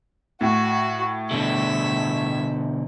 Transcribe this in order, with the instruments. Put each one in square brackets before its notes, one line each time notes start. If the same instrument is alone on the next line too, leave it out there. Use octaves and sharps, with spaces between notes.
[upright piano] A2 [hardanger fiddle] F#4
[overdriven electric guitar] B2 D3 [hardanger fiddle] E5